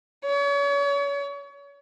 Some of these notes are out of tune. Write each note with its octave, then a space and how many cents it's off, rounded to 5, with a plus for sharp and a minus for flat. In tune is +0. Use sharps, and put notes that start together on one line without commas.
C#5 +35